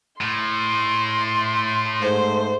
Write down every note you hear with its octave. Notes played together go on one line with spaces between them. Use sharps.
A2 C6
G#2 A3 C5